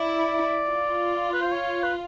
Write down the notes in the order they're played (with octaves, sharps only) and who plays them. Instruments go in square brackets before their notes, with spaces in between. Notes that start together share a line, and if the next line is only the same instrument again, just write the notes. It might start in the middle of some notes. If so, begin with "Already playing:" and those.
Already playing: [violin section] E4 [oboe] D5
[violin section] F4
[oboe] B4
C5
C#5
B4